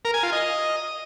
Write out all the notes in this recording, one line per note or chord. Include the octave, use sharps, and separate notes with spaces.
A#4
G#5
F4
D#5